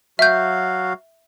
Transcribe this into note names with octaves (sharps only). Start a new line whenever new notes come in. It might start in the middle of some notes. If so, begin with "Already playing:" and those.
F#3 F#4 E5 F5 G6